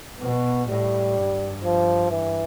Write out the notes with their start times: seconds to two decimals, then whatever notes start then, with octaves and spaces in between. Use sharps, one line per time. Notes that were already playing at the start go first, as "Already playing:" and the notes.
0.20 B2 B3
0.68 A2 G3
1.16 G2
1.64 F3
2.11 E3